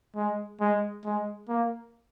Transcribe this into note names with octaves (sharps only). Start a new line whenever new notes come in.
G#3
G#3
G#3
A#3